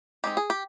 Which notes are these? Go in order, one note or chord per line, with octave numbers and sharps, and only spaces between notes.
G#3 C4 D#4 G4
G#4
G4